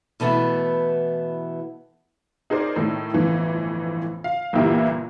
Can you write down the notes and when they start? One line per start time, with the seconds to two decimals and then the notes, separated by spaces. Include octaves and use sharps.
0.20 B2 E3 A3 B3 E4
2.50 D#4 G#4 A#4 C5 D5
2.76 A2 D#3
3.14 G1 F2 A2 E3
4.24 F5
4.53 G1 A#2 E3 E4 G4 A#4